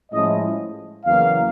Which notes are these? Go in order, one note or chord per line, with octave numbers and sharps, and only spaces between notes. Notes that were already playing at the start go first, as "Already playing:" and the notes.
A2 F3 G#3 C#4 E4 D#5
E2 C#3 F#3 A#3 F5